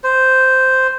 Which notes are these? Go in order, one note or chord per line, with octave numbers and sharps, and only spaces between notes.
C5